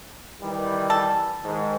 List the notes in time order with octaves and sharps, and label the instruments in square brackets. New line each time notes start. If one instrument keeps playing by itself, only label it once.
[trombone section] D#3 E3 G3
[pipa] A4
[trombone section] G#2 D#3